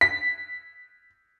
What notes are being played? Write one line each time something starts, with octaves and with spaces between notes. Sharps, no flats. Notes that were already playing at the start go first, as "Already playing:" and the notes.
B6